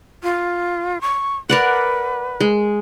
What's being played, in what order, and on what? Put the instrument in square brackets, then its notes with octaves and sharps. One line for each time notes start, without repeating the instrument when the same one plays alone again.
[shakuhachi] F4
C#6
[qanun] A#4 D5 F#5 [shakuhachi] B4
[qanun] G#3